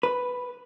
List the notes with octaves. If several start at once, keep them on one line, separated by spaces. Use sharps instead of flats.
B4